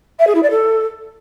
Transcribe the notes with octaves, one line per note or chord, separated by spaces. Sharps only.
E5
G#4
E4
D5
A4